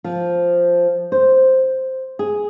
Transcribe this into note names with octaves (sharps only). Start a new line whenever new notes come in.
F3
C5
G#4